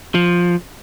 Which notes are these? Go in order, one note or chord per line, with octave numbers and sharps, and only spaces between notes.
F3